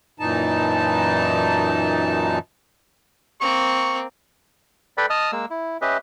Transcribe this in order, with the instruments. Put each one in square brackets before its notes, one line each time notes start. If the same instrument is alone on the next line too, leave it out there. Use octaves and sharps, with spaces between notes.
[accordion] F#2 A#2 E3 D#4 A5
[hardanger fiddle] A#3 C4 [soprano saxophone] C#6
[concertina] A4 B4 D5 G5 B5
D#5 A5 D#6 F6
G#3 A#3 E6
E4
C#4 G4 B4 D#5 E5